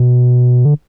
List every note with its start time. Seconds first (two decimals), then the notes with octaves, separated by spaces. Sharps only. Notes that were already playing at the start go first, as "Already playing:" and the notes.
Already playing: B2
0.65 D3